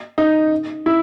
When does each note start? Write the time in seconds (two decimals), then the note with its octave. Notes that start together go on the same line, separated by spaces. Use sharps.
0.18 D#4
0.86 E4